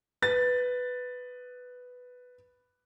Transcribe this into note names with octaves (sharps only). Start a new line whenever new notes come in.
B4 A6